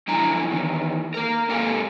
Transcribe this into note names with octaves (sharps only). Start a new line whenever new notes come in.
F#2 D3 F3 E4 G#5 A#5
E2 D#3
A#3 A#4
G#2 A#3 G4 A4 F5 G#5